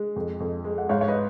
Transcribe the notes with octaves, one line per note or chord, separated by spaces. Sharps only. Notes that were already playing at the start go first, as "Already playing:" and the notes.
Already playing: G#3
F2
F2
G#3
F#5
G#2 C#5 F5
C#5
B4 D#5